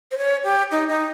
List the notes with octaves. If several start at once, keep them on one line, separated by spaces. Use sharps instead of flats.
C5
C#5
G4
D#4
D#4